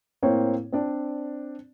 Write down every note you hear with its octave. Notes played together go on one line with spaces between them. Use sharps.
A2 A#3 C4 C#5
C4 D4 D5